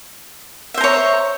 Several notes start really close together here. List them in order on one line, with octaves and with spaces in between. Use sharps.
E5 C5 A#5 C#5